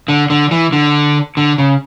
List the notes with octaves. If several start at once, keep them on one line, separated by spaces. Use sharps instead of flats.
D3
D3
E3
D3
D3
C#3